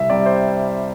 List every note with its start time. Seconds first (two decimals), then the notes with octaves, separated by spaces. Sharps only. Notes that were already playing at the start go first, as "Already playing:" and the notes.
Already playing: C2 E5
0.10 C3 G3 D5
0.26 C5